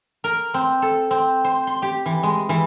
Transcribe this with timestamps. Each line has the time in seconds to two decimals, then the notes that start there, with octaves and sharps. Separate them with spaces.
0.24 A#4
0.54 C4
0.82 A4
1.11 C4
1.44 C5
1.67 C6
1.82 G4
2.06 E3
2.23 G#3
2.49 E3